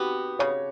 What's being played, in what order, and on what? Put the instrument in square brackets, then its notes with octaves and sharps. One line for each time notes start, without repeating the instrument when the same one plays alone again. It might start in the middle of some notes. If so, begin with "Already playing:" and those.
Already playing: [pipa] B3 [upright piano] F#4 G4
[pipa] C#3 [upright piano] C#5